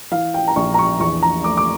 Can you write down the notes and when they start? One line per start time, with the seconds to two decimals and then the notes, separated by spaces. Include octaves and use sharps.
0.11 E3 F5
0.34 G5
0.48 A#5
0.56 A#1 C#6
0.74 A#5
0.79 C#6
1.00 E2 C#6
1.23 A#5
1.44 A3 D6
1.57 D6